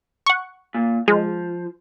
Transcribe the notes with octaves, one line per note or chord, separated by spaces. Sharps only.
F#5 C#6
A#2
F3 G#3